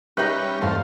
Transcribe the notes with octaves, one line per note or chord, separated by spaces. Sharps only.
G3 C#4 D#4 G4 B4 E5 F#6
E2 G2 A3 C4 F5